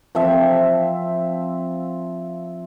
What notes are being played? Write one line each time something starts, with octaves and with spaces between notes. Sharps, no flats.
F3 C4 E5